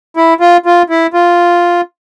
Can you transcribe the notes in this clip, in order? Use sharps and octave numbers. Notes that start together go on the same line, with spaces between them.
E4
F4
F4
E4
F4